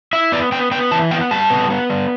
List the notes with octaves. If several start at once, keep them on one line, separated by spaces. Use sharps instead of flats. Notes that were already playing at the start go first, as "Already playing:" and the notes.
E4 E5
B3 D5
B3 G5
B3 G5
E3 A5
B3 G5
G3 A5
B3
B3
G3